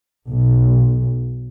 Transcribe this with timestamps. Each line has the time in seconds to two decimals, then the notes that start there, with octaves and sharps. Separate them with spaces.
0.27 B1